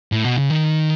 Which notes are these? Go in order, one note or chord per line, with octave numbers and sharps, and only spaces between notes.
A2
B2
C#3
D#3